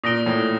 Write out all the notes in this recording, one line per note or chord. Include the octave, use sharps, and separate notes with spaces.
A#2 D#6 A#6 D7 G7
A2